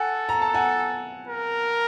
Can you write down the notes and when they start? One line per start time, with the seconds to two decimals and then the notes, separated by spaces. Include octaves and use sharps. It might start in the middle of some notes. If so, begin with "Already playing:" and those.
Already playing: A4 F#5 G#5
0.29 A#5
0.42 A5
0.54 F#5 G#5
1.28 A#4